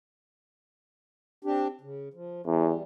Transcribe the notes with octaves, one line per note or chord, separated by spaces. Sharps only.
C4 D4 G4
C#3
F3
E2 G3